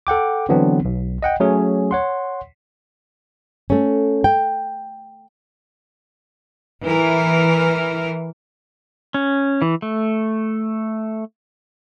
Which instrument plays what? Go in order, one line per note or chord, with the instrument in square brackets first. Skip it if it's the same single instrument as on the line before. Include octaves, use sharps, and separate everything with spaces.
[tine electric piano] A4 F#5 G5 D6
D3 E3 F#3 B3 C4 D4
B1
D#5 F#5 G5
F#3 A3 C#4 G#4
C#5 F#5 C6
[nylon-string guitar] A3 C#4
G5
[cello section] E3 A#4
[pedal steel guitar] C#4
E3
A3